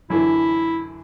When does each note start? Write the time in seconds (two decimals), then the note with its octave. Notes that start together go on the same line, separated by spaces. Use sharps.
0.10 F#2 D3 E3 F#3 E4